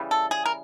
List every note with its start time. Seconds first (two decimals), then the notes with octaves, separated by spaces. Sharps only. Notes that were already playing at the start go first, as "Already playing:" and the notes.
Already playing: C#3 E3 G3
0.11 A4
0.31 G#4
0.45 A#4